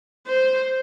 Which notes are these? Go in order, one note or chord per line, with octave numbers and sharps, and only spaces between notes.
C5